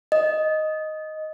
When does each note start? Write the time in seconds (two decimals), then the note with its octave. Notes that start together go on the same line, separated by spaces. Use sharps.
0.12 D#5